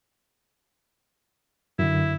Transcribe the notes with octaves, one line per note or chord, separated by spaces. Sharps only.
F#2 D3 E4